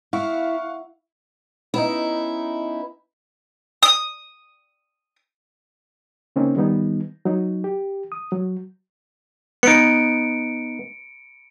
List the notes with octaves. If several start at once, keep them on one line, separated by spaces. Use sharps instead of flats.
E4 F5 F#5 C#6
B3 C#4 D#4 E4
D#6
C#3 A#3 C4 C#4 D#4
D#3 G3 B3 D#4
F#3 D#4
G4
D#6
F#3
B3 D#4 C#7 D7